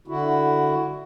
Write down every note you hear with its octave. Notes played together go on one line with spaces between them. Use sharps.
D3 E4 F#4